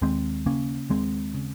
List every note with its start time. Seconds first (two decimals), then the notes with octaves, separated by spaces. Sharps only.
0.02 D#2 G#3 C4
0.46 C#3 A#3 C#4
0.90 D#2 G#3 C4
1.34 C#3